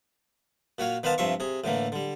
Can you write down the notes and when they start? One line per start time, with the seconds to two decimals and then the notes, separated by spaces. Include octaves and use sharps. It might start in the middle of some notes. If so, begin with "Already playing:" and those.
0.78 A#2 F#4 C#5 F5
1.03 D#3 B3 B4 C5 F5 A5
1.18 G2 C3 F3 E5 C6 C#6
1.40 C3 G#4
1.64 A2 D3 E3 A#3
1.92 D3 G3